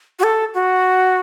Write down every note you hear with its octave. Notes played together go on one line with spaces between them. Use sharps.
F#4
A4
F#4